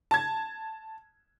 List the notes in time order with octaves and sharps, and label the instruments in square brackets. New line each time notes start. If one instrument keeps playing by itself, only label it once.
[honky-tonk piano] A5 G#6